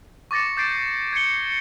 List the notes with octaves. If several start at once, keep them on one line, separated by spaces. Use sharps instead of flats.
C#6 D6 A6 A#6 C#7
D6 G6 A6 C7 D7
G#6 C7 C#7 G7